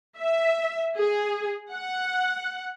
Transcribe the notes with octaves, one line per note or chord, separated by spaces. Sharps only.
E5
G#4
F#5